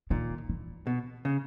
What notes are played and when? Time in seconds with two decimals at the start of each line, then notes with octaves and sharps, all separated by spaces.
0.10 A#2 D#3
0.49 E3
0.87 B2
1.25 C#3